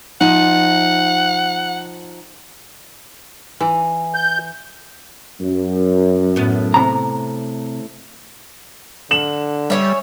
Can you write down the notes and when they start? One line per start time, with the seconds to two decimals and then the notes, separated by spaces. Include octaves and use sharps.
0.21 F3 D#4 F#5
3.61 E3
4.14 G6
5.40 F#2
6.36 A2 B3
6.74 C3 A#5
9.11 D3 E7 F#7
9.70 G3 C#4 C#5 E5